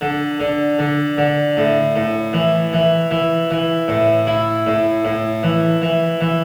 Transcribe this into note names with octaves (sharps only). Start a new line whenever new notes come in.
D3
D3
D3
D3
A2
A2
E3
E3
E3
E3
A2
E4
A2
A2
E3
E3
E3